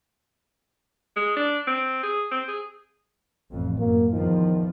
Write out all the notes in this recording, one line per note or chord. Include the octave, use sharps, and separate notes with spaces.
G#3
D4
C4
G#4
C4
G#4
A1 F2
F#2 A#3
E2 D#3 F3